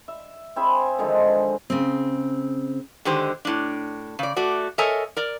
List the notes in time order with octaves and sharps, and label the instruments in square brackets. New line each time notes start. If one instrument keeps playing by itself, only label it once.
[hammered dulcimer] E5
C4 G#4 E5 B5
D3 D#3 F3 G#3
[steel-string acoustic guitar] C#3 C4
[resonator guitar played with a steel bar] D3 D#3 G#3 G4 C5
A2 D4
C#3 D5
A3 F#4 D5
A4 A#4 C#5 D#5 E5 G#5
A#4 D5